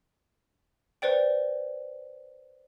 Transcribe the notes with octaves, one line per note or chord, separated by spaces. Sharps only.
B4 C5 D5 G5